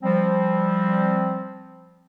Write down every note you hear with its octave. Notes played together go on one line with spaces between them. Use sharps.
F3 G3 C4